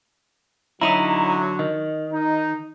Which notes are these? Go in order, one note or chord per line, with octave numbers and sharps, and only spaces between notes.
D3 F#3 D#4 E4 A#5 B5 D#6
D#3 D#5
D#4